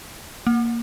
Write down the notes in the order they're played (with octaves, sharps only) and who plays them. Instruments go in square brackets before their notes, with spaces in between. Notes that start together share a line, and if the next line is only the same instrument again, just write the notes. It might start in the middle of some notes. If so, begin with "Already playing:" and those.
[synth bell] A#3